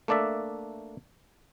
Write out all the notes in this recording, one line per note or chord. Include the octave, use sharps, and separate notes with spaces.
A3 A#3 D4 D5 E5